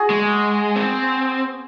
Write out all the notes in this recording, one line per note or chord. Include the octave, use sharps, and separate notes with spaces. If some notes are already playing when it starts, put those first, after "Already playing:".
Already playing: F#4 G#4
G#3
C4